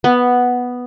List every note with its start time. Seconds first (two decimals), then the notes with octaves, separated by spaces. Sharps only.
0.04 B3